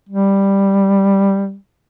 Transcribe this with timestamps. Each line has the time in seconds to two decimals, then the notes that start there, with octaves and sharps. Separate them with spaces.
0.09 G3